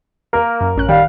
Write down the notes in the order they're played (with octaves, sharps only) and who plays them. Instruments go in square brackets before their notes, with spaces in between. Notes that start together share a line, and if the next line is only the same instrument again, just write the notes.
[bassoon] A#3 [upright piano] A#4
[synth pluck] F#2
A1 C#4 F#6
[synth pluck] D#3 [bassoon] G3 [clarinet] F5